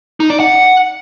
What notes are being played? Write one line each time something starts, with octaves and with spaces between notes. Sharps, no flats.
D#4
D5
F#5